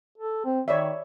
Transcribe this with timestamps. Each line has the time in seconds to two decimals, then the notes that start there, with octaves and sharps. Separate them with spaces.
0.18 A4
0.45 C4
0.68 D#3 C#5 D5 E5